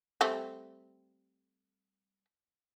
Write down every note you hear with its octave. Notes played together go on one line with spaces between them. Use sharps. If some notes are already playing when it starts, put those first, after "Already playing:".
G3 A3 C4